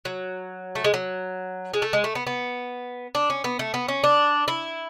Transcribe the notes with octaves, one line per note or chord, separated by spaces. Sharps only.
F#3
A3
G#3
F#3
G#3
A3
G#3
A3
B3
B3
D4
C#4
B3
A3
B3
C#4
D4
E4